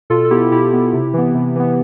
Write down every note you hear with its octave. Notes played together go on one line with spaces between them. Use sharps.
B2 F4 A4
A4
B3 E4 G4
B2 E4 G4
B3
C3
E3 B3
C3
E3 B3